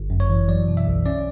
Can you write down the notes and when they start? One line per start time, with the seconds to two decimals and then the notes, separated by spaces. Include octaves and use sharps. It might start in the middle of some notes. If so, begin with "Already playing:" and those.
Already playing: G1
0.10 F#2
0.20 C#5
0.30 E3
0.48 F#3 D5
0.68 B2
0.77 E5
0.87 B1
1.06 C#4 D5